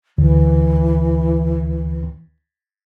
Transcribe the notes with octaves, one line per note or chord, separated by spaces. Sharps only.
D2 E3